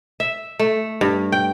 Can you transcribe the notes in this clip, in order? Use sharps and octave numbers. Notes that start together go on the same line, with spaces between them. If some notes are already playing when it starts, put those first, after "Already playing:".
E5
A3
G2
G5